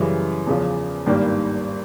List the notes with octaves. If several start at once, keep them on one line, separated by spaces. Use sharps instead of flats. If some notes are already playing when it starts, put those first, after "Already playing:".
Already playing: F#2 C#3 E3 G3
E2 C#3 F3
G#1 G2 D#3 G3 A#3